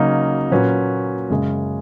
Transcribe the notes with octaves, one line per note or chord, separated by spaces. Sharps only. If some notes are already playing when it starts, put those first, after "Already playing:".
Already playing: C#3 F#3 A#3 D#4
A#2 F#3 C#4 F#4 B4
F#2 C#3 G#3